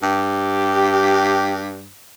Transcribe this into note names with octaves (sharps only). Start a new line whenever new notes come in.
G2 G4